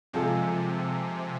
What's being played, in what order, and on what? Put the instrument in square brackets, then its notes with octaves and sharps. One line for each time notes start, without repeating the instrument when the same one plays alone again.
[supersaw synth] C3 [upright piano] F3 G#3 C4 F4 A4